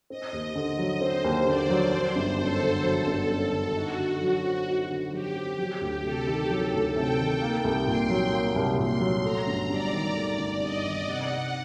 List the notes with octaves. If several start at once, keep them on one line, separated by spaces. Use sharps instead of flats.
C4 D#5
D#2
D3
F#3
C4 C5
D#2
D3 D5
F#3
F#3 C5
G1
F#2 A4
D3
F#3
G1
F#2
D3
D#4 F#4
D3
F#3
C4
D#4
D3
F#3 G4
C4
F#3 G4
D2
C3 A4
D#3
F#3
D2
C3 G5
D#3
A#3
C2
A#2 C6
F#3
A#3
C2
A#2 C6
F#3
A3 A#5
G1
G2 D5
D#3
A3
G1
G2 D#5
D#3
C3 F#5
C3